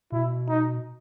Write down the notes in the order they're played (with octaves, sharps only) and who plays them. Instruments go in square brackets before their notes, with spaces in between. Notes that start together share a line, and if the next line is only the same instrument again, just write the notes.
[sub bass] B2 [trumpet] E4
[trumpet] D#4